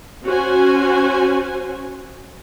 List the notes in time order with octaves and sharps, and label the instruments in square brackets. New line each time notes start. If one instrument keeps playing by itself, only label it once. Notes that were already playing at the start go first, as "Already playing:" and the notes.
[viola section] C#4 F#4 C5 G#5